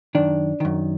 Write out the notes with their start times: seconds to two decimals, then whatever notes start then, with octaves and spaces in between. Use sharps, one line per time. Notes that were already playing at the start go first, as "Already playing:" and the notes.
0.15 F#2 D#3 D4
0.60 F#2 D#3